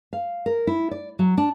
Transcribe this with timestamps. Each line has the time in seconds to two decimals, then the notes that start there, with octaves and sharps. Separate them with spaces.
0.13 F5
0.46 A#4
0.67 E4
0.91 D5
1.19 F#3
1.38 D4